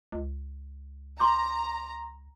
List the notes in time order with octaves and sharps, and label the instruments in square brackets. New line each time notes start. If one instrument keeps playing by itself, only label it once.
[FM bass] C#2
[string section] A#5 [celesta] C6 D6 G6